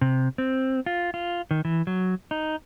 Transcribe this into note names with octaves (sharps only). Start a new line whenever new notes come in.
C3
C4
F4
F4
D#3
E3
F#3
D#4